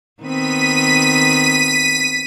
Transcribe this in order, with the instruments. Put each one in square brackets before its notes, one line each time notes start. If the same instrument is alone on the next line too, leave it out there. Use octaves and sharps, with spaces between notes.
[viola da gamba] D#3 B3 C4 [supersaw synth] B6 D#7